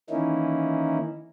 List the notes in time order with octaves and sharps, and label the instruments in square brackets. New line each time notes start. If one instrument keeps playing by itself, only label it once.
[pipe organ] D#3 E3 A#3 C#4 D#4 E4